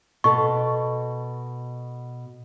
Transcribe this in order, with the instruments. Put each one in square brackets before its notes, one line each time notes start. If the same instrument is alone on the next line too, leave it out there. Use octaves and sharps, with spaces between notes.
[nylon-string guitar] B2 A4 [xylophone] C#6